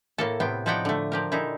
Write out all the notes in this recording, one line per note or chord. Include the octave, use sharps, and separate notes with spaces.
A2 A#3 A4
A2 C3 B3 G5
F3 D#4 E4 D5 F#5 G5
D3 A3
F3 G4 A#4
A#2 D3 D#4 E4